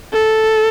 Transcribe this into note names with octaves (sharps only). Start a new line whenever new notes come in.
A4